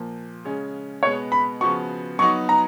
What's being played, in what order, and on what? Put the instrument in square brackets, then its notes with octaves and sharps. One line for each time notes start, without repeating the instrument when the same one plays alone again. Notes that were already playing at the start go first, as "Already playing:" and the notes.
Already playing: [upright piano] A#2 F3 A#3
C#3 G#3 C#4
[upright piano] B2 G#3 B3 [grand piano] C#5
[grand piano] B5
[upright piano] C#3 F3 B3 F#4 [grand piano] C#6
[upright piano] F#3 B3 D#4 F#4 [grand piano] C#6
[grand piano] A#5